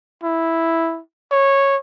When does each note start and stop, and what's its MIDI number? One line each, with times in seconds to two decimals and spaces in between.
0.24 1.00 64
1.32 1.77 73